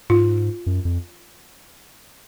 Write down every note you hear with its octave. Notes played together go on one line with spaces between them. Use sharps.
G#2 F4
F#2
F2